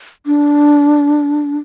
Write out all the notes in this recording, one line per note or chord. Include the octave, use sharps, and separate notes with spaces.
D4